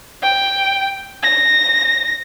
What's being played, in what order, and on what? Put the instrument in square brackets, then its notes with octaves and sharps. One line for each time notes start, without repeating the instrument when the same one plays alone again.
[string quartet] G5
A#6